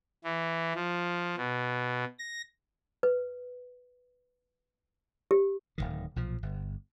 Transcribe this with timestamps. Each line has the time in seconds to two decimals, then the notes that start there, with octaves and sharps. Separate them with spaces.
0.24 E3
0.75 F3
1.37 B2
2.19 A#6
3.03 B4
5.31 G4
5.78 D1 G#1 D#3
6.16 B1 A#2 F3
6.43 G1